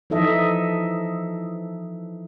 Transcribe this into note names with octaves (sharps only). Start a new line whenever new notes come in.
E3 F3 D#4 A4 D#5 E5